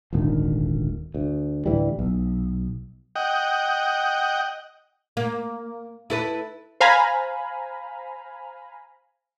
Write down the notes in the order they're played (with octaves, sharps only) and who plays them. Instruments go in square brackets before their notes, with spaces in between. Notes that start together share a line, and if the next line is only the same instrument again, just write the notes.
[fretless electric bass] D#1 G#1 D2 D#3
D2
D2 A2 E3 G3
B1
[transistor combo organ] D#5 F#5 G5
[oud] A#3
E4 A4 B4
[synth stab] C5 F5 G#5 A#5 B5